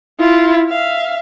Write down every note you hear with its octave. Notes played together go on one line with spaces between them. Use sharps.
E4 F4
E5 F5